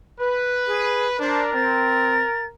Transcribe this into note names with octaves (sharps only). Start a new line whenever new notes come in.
B4
G#4
D4 A#4 C5
C4 A6